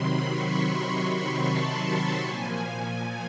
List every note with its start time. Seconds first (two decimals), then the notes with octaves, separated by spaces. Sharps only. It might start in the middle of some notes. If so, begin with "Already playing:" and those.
Already playing: C3 D#3 F#3 B5 C6
0.27 C#6
0.66 C6
1.42 A5
2.19 A#2 F3 G#5